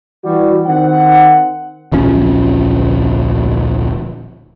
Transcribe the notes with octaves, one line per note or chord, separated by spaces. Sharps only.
E3 G3 F#4
D#3 C4 F#5
D1 A#1 F3 C#4